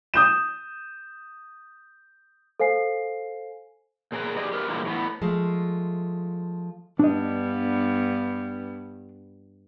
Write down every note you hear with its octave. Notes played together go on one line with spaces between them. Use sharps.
D#6 G6 E7
A4 C5 F5 G#5 C7
A#2 G#4 A#4 B4
G4 G#4 D5 D#5
G4 A#4 B4
A#2 D3 E3 G3 G#3 A#3
A2 E3 B3
F3 G#3 A3
G2 B3 D4 D#5